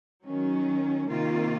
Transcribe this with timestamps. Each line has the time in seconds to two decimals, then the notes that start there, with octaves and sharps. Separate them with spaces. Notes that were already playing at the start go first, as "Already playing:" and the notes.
0.24 D#3 F#3 C#4
1.08 C3 D#3 A#3 F4